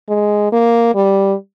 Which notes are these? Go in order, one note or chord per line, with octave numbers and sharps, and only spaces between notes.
G#3
A#3
G3